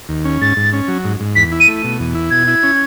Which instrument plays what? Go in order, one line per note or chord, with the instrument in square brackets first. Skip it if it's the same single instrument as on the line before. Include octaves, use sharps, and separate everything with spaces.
[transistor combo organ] D#2
C#4
[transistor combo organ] G#2 [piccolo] A6
[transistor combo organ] G#2
C#4
F#3
G#2
G#2
[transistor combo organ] E2 [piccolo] B6
[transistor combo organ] E4
[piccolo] D#7
[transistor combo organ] A3
B2
E2
E4
[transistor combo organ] B2 [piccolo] G#6
[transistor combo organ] E4
C#4